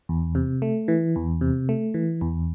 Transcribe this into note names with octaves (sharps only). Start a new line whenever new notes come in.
E2
C3
A3
E3
E2
C3
A3
E3
E2